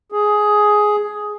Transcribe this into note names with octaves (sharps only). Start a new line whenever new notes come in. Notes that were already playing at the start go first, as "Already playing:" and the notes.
G#4